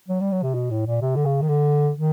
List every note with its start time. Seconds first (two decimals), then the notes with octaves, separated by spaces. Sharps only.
0.08 F#3
0.20 G3
0.32 F#3
0.43 C3
0.54 B2
0.71 A2
0.86 A#2
1.01 C3
1.16 D3
1.25 C#3
1.42 D#3
1.49 D3
1.96 D#3